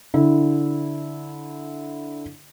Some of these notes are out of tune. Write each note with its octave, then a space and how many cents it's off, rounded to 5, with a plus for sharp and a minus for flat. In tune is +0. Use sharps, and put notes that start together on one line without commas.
D3 -10 E4 -15